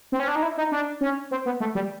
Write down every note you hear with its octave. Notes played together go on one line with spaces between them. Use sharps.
C4
C#4
D4
D#4
E4
D#4
D4
C#4
C4
B3
A3
G3